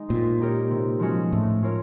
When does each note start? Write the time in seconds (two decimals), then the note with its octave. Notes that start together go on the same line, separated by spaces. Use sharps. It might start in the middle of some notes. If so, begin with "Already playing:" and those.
Already playing: G#3 D#4
0.09 A#2 C4
0.40 D#4 G4 A#4 C#5
0.71 C3
0.99 F3 G#3 C#4 F#4
1.32 A2 A3
1.62 C#4 F4 A#4 C#5